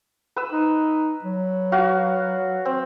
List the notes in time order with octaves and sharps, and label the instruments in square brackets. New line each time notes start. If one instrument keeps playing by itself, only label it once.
[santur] B4 E6
[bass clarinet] D#4
F#3
[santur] F#4 F5
C4